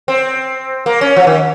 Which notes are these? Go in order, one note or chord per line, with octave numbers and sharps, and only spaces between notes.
C4
A#3
C#4
F3
D#3